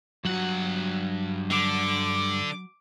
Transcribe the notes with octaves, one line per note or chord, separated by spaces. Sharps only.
G2 F#3 F#4 F#5
D3 D6